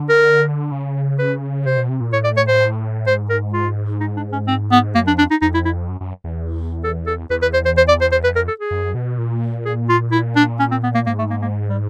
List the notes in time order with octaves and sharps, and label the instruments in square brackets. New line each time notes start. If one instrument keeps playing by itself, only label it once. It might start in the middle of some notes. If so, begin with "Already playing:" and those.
Already playing: [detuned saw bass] D3
[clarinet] A#4
[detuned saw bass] C#3
[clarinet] B4
[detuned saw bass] C3 [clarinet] C5
[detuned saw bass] B2
C3
A#2
[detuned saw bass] A2 [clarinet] C#5
[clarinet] D5
C#5
C5
[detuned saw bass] G#2 [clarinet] C5
[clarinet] A#4
F4
D#4
D4
C#4
C4
B3
[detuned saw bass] F#2 [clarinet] A#3
[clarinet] D4
[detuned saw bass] F2
[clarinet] D4
D#4
[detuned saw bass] F2 [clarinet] D#4
[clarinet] E4
E4
[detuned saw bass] F#2
F#2
E2
[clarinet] A4
A4
[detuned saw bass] E2 [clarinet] B4
[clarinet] B4
C5
C5
C5
D5
C5
C5
[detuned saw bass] F2 [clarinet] B4
[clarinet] A#4
A4
G#4
[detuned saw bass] F#2
B2
A#2
[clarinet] G#4
F4
E4
D4
C#4
C4
B3
A#3
[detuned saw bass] G#2 [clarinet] A#3
[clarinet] A3
A#3
A#3
G3